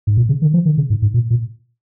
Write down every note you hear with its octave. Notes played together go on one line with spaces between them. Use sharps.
G#2
A#2
C#3
D#3
F3
D#3
C#3
G#2
G#2
A#2
A#2